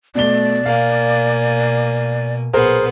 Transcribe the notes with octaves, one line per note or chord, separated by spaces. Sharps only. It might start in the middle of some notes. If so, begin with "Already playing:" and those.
B2 A3 D5 G7
B2 A#3 F5 G#5
B1 A#2 B3 G#4 A#4 C5